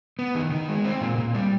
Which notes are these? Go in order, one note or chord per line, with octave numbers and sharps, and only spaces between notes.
B3
D#3
D#3
G#3
C4
A#2
A#2
G3